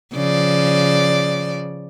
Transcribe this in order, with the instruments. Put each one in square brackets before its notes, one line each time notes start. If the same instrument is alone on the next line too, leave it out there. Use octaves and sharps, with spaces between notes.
[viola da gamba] C#3 F3 D5